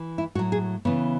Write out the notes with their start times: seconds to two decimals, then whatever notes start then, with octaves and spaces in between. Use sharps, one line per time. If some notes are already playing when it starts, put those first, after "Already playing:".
Already playing: E3
0.18 E4
0.35 A2 F#4
0.39 F#3
0.52 G#4
0.85 C#3 E3 B3